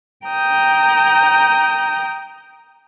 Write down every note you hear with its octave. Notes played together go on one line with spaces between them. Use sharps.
G5 A#5 D#6 G6